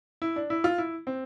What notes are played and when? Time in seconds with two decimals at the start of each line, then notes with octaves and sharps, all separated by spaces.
0.22 E4
0.36 D4
0.50 E4
0.64 F4
0.78 E4
1.07 C4